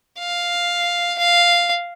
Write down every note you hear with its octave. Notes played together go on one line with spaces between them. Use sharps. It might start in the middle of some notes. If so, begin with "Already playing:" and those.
F5
F5